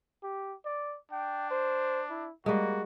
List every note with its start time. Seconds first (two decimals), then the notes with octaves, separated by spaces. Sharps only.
0.23 G4
0.65 D5
1.11 D4 G5
1.51 C5
2.10 E4
2.46 G3 G#3 A#3 F#4